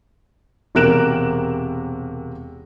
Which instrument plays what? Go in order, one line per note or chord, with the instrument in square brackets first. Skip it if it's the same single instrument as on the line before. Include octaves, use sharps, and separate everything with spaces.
[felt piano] E1 C3 A#4 F#6 D7 E7